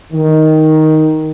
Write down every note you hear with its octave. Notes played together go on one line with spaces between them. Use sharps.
D#3